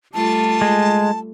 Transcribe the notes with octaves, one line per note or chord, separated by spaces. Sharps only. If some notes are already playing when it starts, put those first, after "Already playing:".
G3 A3 F4 A5
G#3